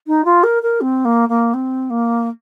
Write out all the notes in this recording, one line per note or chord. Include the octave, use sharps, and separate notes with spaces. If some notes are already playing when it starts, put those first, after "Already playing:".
D#4
F4
A#4
A#4
C4
A#3
A#3
C4
A#3